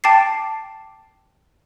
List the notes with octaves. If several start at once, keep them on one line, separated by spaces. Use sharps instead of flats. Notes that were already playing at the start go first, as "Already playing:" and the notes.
G5 A5 D6 A6 C7